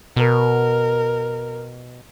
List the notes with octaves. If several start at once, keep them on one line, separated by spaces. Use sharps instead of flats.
B2 A#4